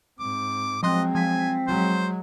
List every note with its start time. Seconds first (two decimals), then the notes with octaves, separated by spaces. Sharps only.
0.19 G#2 C4 D6
0.83 F3 F#3 G#3 C4 D#5 C6 F#6
1.15 F3 G#5 B6
1.67 F#3 G#3 C5